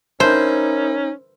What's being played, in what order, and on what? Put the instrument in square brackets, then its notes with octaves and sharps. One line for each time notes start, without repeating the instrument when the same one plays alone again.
[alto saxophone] C#4 [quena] D#4 [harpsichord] E4 A#4 E5 [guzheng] C5